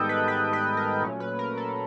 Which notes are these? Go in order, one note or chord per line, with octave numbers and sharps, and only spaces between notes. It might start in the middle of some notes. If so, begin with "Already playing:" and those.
Already playing: G#2 D#3 G3 B3 D#4 A4 D#5 G5
B4
B4
B4
A#4
A#2 F#3 A3 C#4
B4
A#4
A4